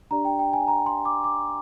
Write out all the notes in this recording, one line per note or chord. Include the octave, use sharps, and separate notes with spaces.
D4 G4 D5 A#5
G5
G5
G#5
A#5
C6
D6
D6